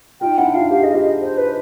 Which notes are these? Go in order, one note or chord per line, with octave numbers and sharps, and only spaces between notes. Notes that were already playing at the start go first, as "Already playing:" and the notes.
D#4 F4 G5
D4 E4 F#5
D#4 F4 F5
G4 F5
G#4 D#5
F4 G4 D#5
C5
B4